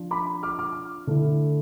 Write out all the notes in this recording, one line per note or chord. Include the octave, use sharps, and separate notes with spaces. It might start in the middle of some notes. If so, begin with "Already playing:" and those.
Already playing: F3 D4
B5 D6
D6 F6
D6 F6
D3 A3 E4